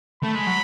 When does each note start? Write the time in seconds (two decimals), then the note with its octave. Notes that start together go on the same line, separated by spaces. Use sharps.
0.23 A3 B5
0.35 G#3
0.47 F#3